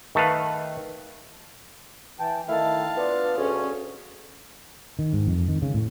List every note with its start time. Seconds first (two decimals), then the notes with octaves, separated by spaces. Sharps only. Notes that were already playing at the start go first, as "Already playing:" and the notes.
0.15 D#3 A3 A4 B4 F5
2.19 E3 G5 A5
2.49 D#3 A3 E4 A4 F5 A5
2.97 B3 D4 F4
3.37 D2 C#4 G#4 C#5
4.99 D#3
5.13 G#2
5.27 F2
5.48 D#3
5.62 C#3
5.74 A2